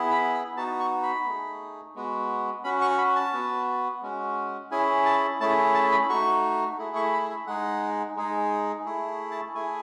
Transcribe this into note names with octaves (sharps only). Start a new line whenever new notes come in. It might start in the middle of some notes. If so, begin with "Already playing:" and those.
Already playing: B3 E4 G#4
B5
B5
B3 D#4 F#4 A5
C#6
B5
A3 D#4 G#4
G#3 B3 F#4
C#4 F#4 B5
C#6
B5
A5
B3 F#4
G#3 C#4 F#4
C#4 E4 G#4 G#5
A5
A3 C#4 E4 G#4 A5
A5
B5
A3 D#4 F#4 C#6
A3 E4 G#4
C#6
B5
E5
G#3 D#4 G#4 F#5
G#3 D#4 G#4
A3 E4 G#4
A5
A3 E4 G#4 G#5